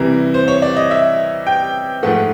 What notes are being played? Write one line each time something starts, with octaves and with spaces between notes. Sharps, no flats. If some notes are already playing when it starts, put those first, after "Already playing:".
Already playing: C2 C3 E3 A#4
C5
C#5
D5
D#5
E5
G5
G#2 F3 A3 F#5